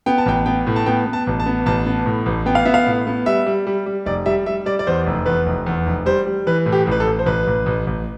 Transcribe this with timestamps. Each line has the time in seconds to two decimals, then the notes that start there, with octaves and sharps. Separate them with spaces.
0.06 B3 G5
0.18 A5
0.26 A1 G5
0.46 B3 G5
0.67 A2
0.76 A5
0.86 B3 G5
1.06 B3
1.13 A5
1.27 A1
1.40 A5
1.46 B3
1.66 A1 A5
1.86 B3
2.06 A2
2.26 A1
2.46 B3 G5
2.55 F5
2.65 B3 E5
2.74 F5
2.86 A2
3.07 B3
3.26 G3 E5
3.46 G3
3.67 G3
3.86 G3
4.06 F1 D5
4.26 G3 E5
4.46 G3 E5
4.66 G3 D5
4.79 D5
4.87 E2 C5
5.06 F1
5.26 E2 B4
5.46 F1
5.66 E2
5.86 F1
6.06 G3 C5
6.26 G3
6.47 E3 B4
6.66 A2
6.72 G4
6.87 A1 B4
7.00 A4
7.07 A1
7.19 C5
7.26 A1 B4
7.47 A1
7.66 A1
7.87 A1